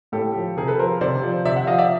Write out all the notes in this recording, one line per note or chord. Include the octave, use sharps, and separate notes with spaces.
A2 G4 A4
F3
C3 G#4 A#4
A4 B4
F3 A#4 C5
C3 C5 D5
F3
C3 D5 E5
E5 F#5
F3 D#5 F5
D5 E5